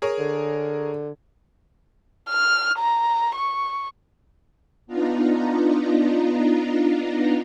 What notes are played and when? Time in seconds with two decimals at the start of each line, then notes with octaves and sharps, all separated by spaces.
0.02 G#4 A#4 C#5
0.19 D3
2.30 F6
2.79 A#5
3.35 C#6
4.87 B3 D4 D#4 F4 A#5